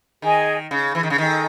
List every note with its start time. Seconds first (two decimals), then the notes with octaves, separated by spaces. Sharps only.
0.22 D#3 G#4 D#5 G#5
0.71 C#3
0.95 E3
1.03 D#3
1.10 C#3
1.18 D#3 A4 D#5 G#5